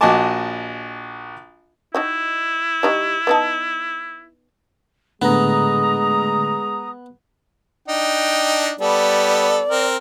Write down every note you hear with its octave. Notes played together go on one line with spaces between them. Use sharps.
A#1 F#4 D#5 G#5 A5 D6
D#4 E4 F#4 G5
G3 D#4 F#4
B3 D#4 A5
A2 D3 G#3 A3 B3 A#5 D#6
D4 D#4 G5
G3 B3 A4 D5
C4 A#4